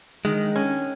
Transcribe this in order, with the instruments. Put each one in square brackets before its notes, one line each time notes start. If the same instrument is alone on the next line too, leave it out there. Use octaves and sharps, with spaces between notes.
[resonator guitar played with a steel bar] D#3 [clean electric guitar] G#3
[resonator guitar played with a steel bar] C#4